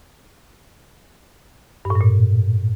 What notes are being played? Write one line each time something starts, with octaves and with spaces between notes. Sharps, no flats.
G2
A2
G2
A#2